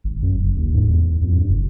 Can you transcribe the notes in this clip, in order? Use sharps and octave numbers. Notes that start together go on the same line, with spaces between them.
G#1
F#2
F#1
D#2
G#2
E2
F2
G2
F#1